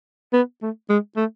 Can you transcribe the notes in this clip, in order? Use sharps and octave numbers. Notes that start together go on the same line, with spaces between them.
B3
A3
G#3
A3